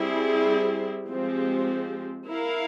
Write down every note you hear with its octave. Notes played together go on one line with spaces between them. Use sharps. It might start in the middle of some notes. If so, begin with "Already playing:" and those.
Already playing: G3 C4 E4 G#4
F3 G#3 C4 G4
E4 A#4 F5